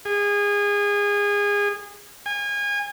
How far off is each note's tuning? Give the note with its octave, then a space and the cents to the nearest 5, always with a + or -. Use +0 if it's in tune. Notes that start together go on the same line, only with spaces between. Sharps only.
G#4 -25
G#5 -30